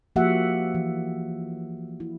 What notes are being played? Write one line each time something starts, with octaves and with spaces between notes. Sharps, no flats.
F3 A#3 F#4 G4 E5 F#5
E3
E4